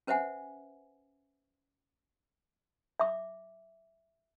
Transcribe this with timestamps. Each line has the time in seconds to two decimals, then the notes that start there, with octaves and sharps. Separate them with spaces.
0.07 C#4 B4 C5 E5 F#5 G#5
3.00 E5 D6